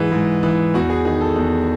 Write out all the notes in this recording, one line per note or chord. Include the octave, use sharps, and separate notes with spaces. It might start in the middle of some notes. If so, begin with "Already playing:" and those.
Already playing: G#2 E3 G#4
G#2
E3
E2 F#4
G#4
D#3 G#4
A4
E2